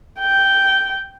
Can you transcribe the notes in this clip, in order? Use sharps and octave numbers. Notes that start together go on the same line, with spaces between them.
G5